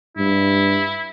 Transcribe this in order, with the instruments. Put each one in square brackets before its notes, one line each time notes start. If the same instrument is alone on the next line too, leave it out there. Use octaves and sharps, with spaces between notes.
[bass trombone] G2 [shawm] E4